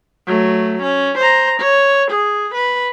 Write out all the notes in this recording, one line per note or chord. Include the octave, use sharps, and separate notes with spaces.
F#3 A3
C#4
C5 A#5
C#5
G#4
B4